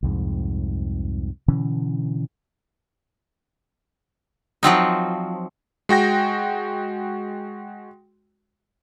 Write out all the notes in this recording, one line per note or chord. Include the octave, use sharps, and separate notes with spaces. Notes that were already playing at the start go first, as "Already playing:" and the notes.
C2 F2 G#2
B2 D3 E3 C#4
F3 F#3 C4 D#4
G#3 F#4 G5 A#6